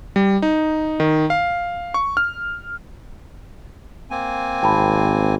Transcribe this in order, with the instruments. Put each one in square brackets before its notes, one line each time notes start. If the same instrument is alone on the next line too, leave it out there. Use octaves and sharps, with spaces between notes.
[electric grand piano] G3
D#4
D#3
F5
C#6
F6
[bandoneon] A#3 C4 G#5
[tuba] G#1 [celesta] G5 A5 B5